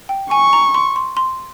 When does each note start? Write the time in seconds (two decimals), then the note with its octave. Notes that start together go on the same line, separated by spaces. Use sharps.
0.09 G5
0.31 G#5 C#6
0.53 A#5
0.74 C6
0.96 C6
1.17 C6